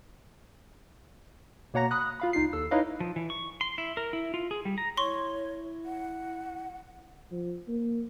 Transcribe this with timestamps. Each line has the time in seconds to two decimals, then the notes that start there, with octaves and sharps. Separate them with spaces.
1.74 B2 A#3 C#5 F#5 A#5 A#6
1.91 B5 D#6 F#6
2.20 F4 F5 B5
2.33 C#2 D#4 F4 C7
2.53 D#2 A4 E6
2.71 D#4 E4 B4 C#5 D#5 F5
3.00 F3
3.16 E3
3.30 C#6
3.61 C6
3.78 E4
3.97 A#4
4.13 E4
4.34 F4
4.51 G#4
4.65 G3
4.78 A#5
4.97 E4 C#5 C6 C#6
5.85 F#5
7.32 F3
7.68 A#3